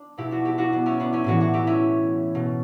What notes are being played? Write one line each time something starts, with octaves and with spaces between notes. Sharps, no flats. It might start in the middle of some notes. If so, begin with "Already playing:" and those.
Already playing: D4
B2 E4 G4
D4 F#4
E4 G4
D4 F#4
B3 D4
C#4 E4
B3 D4
C#4 E4
A2 E3 D4 F#4
D4 F#4
E4 G4
C#4 E4
B2